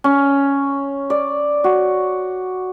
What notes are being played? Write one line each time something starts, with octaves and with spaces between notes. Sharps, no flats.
C#4
D5
F#4